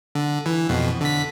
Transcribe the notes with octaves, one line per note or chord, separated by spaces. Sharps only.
D3
E3
F2 B2
D3 B6